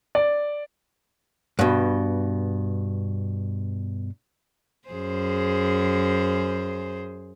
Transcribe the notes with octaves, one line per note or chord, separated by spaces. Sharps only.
D5
G2 B2
F#2 G#4 C5